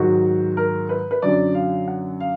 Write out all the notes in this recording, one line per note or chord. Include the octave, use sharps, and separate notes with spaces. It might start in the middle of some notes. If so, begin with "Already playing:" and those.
Already playing: G#2 D#3 F#3 F#4
A#4
B4
B4
F#2 D3 F#3 D5
F5
F#5
F5